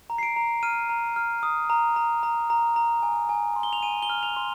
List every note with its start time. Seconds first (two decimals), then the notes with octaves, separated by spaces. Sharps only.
0.10 A#5
0.18 C7
0.23 D7
0.36 A#5
0.63 F6 D#7
0.89 A#5
1.16 F6
1.43 D#6
1.70 A#5
1.96 A#5
2.23 A#5
2.50 A#5
2.76 A#5
3.03 G#5
3.29 G#5
3.56 C6
3.63 G7
3.73 F7
3.83 G#5 D#7
4.03 G7
4.09 F6
4.23 F7
4.36 C6